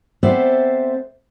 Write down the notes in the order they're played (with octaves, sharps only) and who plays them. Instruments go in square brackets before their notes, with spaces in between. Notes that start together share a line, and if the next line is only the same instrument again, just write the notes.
[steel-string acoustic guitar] B3 C4 A4 C5 D5 E5